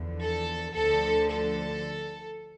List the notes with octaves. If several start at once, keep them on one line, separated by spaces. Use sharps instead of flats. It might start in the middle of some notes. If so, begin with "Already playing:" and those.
Already playing: E2 D3 F3
A4
D2 D3 F3 A4
A4